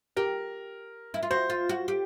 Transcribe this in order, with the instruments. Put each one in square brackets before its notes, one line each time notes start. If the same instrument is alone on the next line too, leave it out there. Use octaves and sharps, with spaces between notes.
[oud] G4 [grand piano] A#4
[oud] E4
F4
[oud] F#4 [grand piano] C5
[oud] F4
F#4
G4